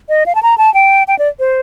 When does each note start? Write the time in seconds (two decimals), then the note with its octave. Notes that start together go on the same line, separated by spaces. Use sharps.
0.09 D#5
0.26 F5
0.35 A5
0.43 A#5
0.58 A5
0.74 G5
1.08 G5
1.19 D5
1.39 C5